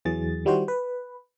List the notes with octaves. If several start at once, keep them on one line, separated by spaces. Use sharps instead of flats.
E2 E3 F#3 G#4 A6
D#3 G3 E4 F#4 C5
B4